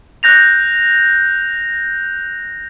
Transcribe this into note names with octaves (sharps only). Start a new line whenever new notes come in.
F#6 G6 A#6 F7